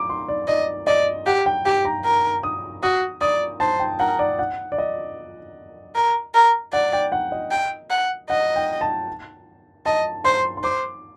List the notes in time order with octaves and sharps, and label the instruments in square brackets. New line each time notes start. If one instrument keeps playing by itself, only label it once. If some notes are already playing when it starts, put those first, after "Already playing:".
Already playing: [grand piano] D6
C6
D5
[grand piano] D5 [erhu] D#5
[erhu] D5 [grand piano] D#5
[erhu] G4 [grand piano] F#5
[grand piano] G5
[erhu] G4 [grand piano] G5
[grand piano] A#5
[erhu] A#4
[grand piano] D#6
[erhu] F#4 [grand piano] D#6
[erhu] D5 [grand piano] D#6
[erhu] C5 [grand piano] A5
[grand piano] G5
[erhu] A#4 [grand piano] F#5
[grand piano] D5
F#5
D5
D#5
[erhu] A#4
A#4
[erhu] D5 [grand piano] F#5
[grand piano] G5
F#5
D#5
[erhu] G5
F#5
[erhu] D#5 [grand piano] F#5
[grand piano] G5
A5
[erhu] D#5 [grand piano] A5
[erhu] C5 [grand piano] C6
[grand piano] C6
[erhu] C5 [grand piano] D6